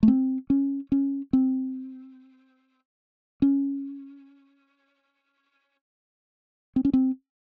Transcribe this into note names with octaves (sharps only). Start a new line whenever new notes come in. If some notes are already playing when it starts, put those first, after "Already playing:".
A3
C4
C#4
C#4
C4
C#4
C4
C#4
C4